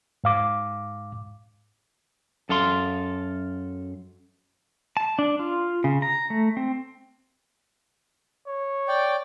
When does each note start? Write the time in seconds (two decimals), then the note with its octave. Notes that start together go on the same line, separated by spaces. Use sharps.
0.24 G#2 F5 D6
2.49 F#2 A4 F5 C6
4.97 A5
5.19 D4
5.39 F4
5.84 C#3
6.02 A#5
6.30 A3
6.57 C4
8.47 C#5
8.88 D5 G5